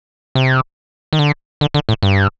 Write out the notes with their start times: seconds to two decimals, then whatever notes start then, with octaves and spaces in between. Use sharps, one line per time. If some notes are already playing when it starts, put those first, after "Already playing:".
0.35 C3
1.13 D#3
1.19 D3
1.61 D3
1.74 D3
1.89 A2
2.03 G2